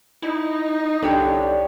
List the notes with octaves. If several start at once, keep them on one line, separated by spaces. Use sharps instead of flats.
D#4 E4
C2 D3 D4 G4 C#5